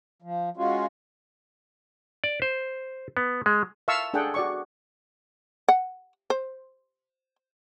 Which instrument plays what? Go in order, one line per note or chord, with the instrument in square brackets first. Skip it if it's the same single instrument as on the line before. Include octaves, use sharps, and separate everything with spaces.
[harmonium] F3
G#3 C#4 F4 F#4
[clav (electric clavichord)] D5
C5
B3
G#3
[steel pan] E5 F5 A5 C#6 E6
D4 G#4 A4 F#5 G5
F#4 D5 C#6
[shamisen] F#5
C5